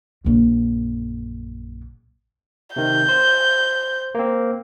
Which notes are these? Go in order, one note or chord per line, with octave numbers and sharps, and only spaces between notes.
A#1 F#2
C3 D#3 G6
C5
A#3 C4